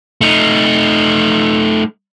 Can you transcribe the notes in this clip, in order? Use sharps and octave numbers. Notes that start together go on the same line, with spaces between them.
A3 D#4